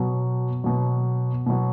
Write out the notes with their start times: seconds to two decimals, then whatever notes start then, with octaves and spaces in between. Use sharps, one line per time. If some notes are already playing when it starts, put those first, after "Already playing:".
Already playing: B2 F#3
0.64 B2 F#3
1.46 B2 F#3